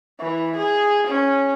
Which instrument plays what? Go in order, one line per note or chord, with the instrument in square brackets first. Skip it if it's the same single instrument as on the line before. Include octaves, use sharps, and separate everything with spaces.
[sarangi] E3
G#4
C#4